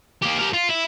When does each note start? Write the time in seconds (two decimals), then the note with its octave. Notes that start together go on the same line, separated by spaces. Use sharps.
0.22 A#3 G4
0.39 G4 A#4
0.53 F4
0.69 E4